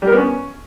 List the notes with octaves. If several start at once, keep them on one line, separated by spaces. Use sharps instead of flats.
G3
A#4
B3
C#4